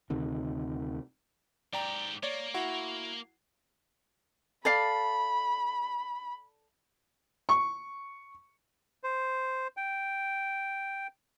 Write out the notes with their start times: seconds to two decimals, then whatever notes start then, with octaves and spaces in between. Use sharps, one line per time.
0.10 D2 C3 D#3
1.73 G#2 G4 D5 G5 A#5
2.23 A#3 C#5 D5
2.54 E4 F#4 F#5
4.65 A4 D5 F5 B5
7.49 C#6
9.03 C5
9.77 G5